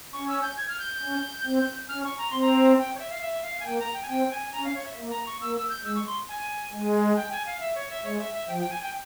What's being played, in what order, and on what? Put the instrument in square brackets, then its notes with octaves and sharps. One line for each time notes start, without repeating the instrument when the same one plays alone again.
[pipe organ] C#4 [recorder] C#6
[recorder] E6
G6
G#6
F6
G6
[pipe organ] C#4
C4
[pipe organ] C#4 [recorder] F6
[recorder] C#6
A#5
[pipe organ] C4 [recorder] C6
[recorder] A#5
G5
C#5
E5
F5
E5
F5
G#5
[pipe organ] A#3 [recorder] G5
[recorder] A#5
G5
G#5
[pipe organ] C4 [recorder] G5
[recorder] G#5
[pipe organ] C#4 [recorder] A#5
[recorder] F5
C#5
E5
[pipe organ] A#3
[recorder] A#5
C#6
[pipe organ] A#3 [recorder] E6
[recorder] E6
G6
[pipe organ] G#3 [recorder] E6
[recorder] C#6
C6
G#5
[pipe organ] G#3
[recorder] G5
G#5
F5
E5
C#5
E5
[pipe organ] G#3 [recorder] C#5
[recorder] E5
E5
[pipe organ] F3 [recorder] G5
[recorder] G5
G#5
G5